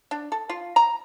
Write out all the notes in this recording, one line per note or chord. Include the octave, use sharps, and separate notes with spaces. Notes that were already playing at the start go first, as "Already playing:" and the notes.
D4
A4
F4
A#5